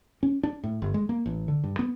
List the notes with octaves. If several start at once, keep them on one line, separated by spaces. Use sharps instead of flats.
C#4
D4
A2
G1
G#3
A#3
A1
D3
G2
B3